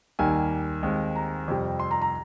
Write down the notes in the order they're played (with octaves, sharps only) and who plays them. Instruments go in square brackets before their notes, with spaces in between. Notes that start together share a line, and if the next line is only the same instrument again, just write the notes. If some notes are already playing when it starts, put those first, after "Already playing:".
[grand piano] D#2 D#3 G3 A#3 G#5
D#2 D#3 G#3 C4
A#5
F2 C3 G3
C6
A#5
A#5